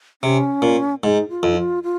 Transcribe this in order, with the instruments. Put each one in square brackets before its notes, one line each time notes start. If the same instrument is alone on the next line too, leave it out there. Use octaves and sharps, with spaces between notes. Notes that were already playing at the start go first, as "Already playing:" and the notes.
[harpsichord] C3 [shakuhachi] C#4
[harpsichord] A#2
[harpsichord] G#2 [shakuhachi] D#4
[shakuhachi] F4
[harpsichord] F2
[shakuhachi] D#4
F4
F4